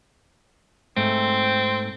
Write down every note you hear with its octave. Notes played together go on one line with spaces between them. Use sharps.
G#2 A3 C4